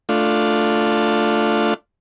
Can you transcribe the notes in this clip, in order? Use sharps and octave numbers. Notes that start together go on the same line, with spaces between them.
A3 D4 F4